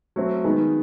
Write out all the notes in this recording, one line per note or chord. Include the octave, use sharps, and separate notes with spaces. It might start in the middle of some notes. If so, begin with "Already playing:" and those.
F#3 A3 C4
D#3 G#3 B3 D#4